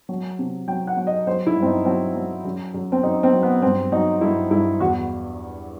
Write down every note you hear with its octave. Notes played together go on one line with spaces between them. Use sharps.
F#3
C3
F#3 G5
F#5
F#3
D#5
F#3 C5
E4
G2
C4
D#4
F#3 C4
F#3
F#2
F#2
C4
F#2 D#4
C4
F#3
B3
G2 C4
F#3 D#4
G2 E4
G2 E4
E2 F#4